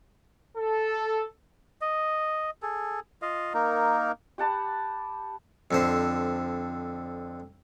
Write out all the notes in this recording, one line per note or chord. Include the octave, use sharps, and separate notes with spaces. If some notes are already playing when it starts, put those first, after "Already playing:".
A4
D#5
G#4 A4
F4 D#5 F5
A#3 D#4 A#4
G4 F#5 A5 B5
F2 D3 C5